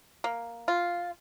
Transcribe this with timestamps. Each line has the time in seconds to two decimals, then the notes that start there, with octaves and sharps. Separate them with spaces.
0.24 A#3
0.68 F4